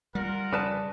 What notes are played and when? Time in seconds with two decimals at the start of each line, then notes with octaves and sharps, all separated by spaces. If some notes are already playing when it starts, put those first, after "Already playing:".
0.15 G3 F4 A#4 F#5
0.53 F2 C#3 B4 D5 A5 D#6